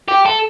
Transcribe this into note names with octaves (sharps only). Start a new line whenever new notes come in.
G4
A4